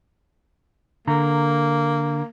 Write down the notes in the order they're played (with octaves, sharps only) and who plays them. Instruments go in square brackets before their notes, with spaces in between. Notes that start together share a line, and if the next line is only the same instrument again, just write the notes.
[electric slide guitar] D3 A#5 [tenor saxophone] A#3